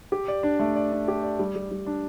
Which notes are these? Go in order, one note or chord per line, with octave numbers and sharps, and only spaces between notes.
G4
D5
D4
A3
D5
D4
G4
D5
G3
G3
G3
D4